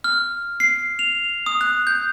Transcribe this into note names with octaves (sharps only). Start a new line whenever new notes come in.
F6
C7
F7
D#6
F#6
G6